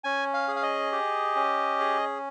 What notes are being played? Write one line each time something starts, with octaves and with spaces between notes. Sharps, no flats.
C#4 G#5
F5
G#4
F5
D#5
G4
C#4
G#4